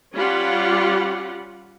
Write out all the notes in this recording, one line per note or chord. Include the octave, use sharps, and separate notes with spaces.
G3 C#4 F4 G4 F#5 B5